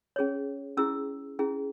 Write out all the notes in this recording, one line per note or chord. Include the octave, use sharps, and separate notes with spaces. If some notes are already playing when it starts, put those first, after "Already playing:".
C#4 G#4 C#5
C#4 E4 G#4 E6
C#4 E4 G#4